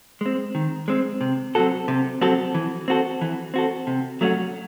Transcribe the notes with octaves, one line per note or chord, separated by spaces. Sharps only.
G#3 C4
D#3
G#3 C4
C3
F#3 C4 F#4 A4
C3
F#3 C4 F#4 A4
E3
C4 F#4 A4
E3
C4 F#4 A4
C3
F#3 A3 C#4 F#4